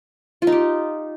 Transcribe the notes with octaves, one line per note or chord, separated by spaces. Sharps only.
F4
D#4
G4